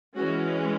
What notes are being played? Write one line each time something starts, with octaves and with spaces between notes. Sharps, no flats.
E3 G#3 C#4 F#4